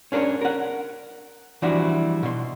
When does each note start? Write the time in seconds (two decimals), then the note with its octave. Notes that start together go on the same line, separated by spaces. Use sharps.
0.12 C#4 D4 A#4 C5 C#5
0.41 A#4 F#5
1.62 E3 F3 G3 D4 E4 F#4
2.23 B2 C6